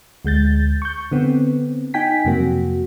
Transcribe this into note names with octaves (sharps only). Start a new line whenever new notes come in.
D2 G#3 G6 A6
C#6 G6
D3 B3 C4
D#4 G5 G#5 B6
F2 C3 F#3 A#3 F#4